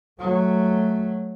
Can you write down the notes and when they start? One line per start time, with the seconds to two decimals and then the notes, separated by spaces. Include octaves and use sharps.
0.20 F#3 A3